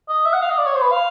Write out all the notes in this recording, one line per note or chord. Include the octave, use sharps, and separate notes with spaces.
D#5
E5
F#5
F5
D#5
D5
C#5
C5
B4
F5